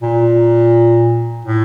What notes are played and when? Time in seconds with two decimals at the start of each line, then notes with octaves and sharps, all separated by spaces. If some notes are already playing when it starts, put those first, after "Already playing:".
0.03 A#2
1.45 A2